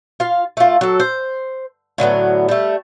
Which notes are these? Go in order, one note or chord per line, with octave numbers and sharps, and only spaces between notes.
F4 F5
A3 F4
F#3 A4
C5
A2 D3 F#3 B3
G3 A3